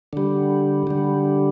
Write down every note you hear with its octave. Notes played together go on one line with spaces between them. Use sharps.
D3 G3
D3 G3